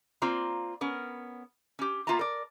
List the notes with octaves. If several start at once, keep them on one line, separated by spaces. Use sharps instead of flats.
A#3 C4 F4 D5 A#5
B3 C#4 A#4
C#4 G4
A#3 B3 F4 E5 A5 A#5
A#4 D5